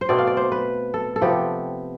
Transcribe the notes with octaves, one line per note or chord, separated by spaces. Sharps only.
C5
B2 A3 C4 D5
F5
D5
C5
B4
A4
A4
C3 F3 B3 G4